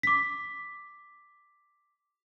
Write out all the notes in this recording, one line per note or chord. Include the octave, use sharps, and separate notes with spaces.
D6 B6